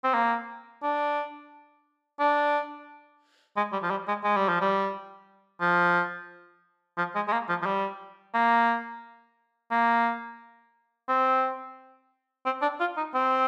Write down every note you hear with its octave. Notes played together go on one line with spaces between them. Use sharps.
C4
A#3
D4
D4
G#3
G3
F3
G3
G#3
G#3
G3
F3
G3
F3
F3
G#3
G#3
A#3
F3
F3
G3
A#3
A#3
C4
C4
D4
F4
D#4
C4